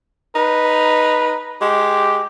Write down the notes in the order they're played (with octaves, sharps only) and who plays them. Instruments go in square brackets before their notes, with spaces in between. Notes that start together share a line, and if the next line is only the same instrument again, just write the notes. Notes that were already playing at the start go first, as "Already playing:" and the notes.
[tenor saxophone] D#4 [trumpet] B4
[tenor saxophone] G#3 [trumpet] G4